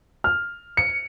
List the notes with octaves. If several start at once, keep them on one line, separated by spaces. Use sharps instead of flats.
F6
C#7